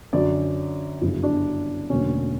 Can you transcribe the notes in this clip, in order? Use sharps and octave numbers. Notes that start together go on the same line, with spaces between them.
F#2 D3 F#3 D5
G1 F#2 C#3 E4
D4
E1 D2 D3 F#3 A#3 C#4